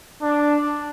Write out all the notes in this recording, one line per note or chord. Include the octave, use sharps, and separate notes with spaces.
D4